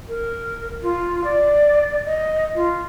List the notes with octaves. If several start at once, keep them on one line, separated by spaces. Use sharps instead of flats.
A#4
F4
D5
D#5
F4